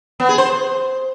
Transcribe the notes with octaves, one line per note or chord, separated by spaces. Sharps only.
B3
G#4
C5